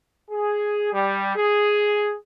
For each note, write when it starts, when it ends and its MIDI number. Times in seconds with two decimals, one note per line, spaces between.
0.29 0.93 68
0.93 1.34 55
1.36 2.14 68